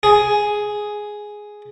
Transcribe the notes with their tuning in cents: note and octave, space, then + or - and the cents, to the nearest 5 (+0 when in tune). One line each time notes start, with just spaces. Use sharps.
G#4 +5